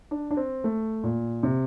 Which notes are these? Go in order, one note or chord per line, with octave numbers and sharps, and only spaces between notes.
D4
D4
C4
A3
A#2
C3